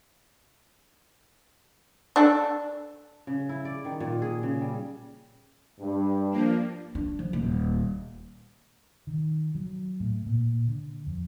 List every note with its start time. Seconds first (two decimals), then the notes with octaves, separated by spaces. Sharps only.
2.16 D4 A4
3.27 C#3
3.49 E4
3.65 D5
3.85 D#3
4.00 A#2
4.22 G#4
4.43 C#3
4.61 G3
5.80 G2
6.31 F3 A#3 D4
6.95 D4
7.19 F3
7.33 D#1
9.07 D#3
9.55 F#3
10.00 A2
10.26 A#2
10.67 D3
11.07 F2